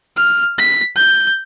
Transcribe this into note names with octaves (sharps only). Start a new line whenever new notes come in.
F6
B6
G6